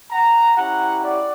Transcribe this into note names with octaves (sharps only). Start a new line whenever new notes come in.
F#5 A#5
C#4 E4 G4 F#5 A#5
D5 F#5